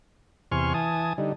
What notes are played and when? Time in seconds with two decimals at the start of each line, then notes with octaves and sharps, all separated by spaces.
0.52 E2 C3 G#5 C6 C#6 F6
0.74 E3 G#5 A5 D#6
1.18 D3 G3 D#4